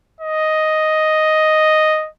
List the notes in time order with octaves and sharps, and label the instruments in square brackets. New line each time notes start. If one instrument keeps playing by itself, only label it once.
[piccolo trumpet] D#5